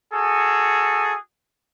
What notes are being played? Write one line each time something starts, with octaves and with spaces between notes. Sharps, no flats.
F#4 G#4 A4